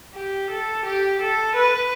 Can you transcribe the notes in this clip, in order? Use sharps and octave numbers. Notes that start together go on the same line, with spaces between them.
G4
A4
G4
A4
B4